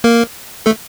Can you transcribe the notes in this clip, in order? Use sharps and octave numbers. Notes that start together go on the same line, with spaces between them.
A#3 A#4
A3 A4